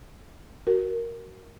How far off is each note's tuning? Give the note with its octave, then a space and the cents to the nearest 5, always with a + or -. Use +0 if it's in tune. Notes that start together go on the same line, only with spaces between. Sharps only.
F#4 +20 A#4 +0